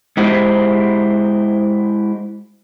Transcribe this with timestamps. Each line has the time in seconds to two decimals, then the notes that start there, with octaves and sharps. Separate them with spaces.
0.17 G#3 E4 F#4 G4 C5